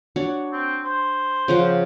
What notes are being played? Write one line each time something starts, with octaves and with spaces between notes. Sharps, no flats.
D4 F#4 C#5
C4
C5
C#3 F3 F#5